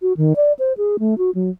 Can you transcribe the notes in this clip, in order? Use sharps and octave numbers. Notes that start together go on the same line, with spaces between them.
F#4
D#3
D5
C5
G#4
A3
F#4
F#3